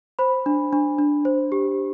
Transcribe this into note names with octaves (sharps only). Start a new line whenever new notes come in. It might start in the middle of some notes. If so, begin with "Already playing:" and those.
C5 B5
D4
D4
D4
C5
G4